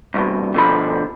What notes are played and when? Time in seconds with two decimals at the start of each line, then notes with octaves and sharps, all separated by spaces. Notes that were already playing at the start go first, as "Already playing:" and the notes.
0.14 C2 G2 B2
0.54 B2 D3 F3 B5